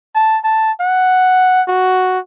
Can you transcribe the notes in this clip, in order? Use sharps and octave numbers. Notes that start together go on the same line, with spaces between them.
A5
A5
F#5
F#4